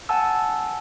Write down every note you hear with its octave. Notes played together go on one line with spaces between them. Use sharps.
F#5 G#5 A5 E6